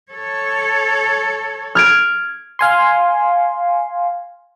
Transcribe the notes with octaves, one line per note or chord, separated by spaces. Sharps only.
A4 C#5
F6 G#6 D7
F5 G#5 C6